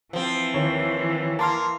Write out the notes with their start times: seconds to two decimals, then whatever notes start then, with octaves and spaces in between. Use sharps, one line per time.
0.13 E3 F3 C4
0.54 D#2 C#5
1.39 A#3 A5 C6 F6